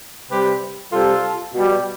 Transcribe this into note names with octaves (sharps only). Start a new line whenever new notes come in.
C3 G3 G4 B4
C3 G3 F4 A4
B2 G3